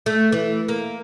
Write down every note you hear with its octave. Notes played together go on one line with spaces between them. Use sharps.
A3
E3
A#3